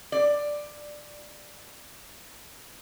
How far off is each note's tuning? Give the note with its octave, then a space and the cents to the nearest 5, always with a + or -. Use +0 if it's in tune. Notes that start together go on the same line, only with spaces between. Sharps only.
D5 +10